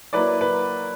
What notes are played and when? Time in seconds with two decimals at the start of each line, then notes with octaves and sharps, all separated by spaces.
0.13 F#3 A#3 E4 B4 D5
0.41 B4